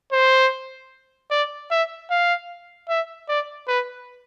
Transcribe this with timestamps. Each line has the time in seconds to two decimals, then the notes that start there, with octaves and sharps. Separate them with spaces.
0.12 C5
1.31 D5
1.71 E5
2.10 F5
2.89 E5
3.28 D5
3.68 B4